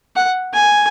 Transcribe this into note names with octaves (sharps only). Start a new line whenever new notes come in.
F#5
G#5